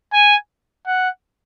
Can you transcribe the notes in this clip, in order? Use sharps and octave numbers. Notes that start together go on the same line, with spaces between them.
G#5
F#5